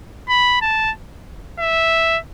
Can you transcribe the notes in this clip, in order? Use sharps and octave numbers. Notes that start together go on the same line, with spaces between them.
B5
A5
E5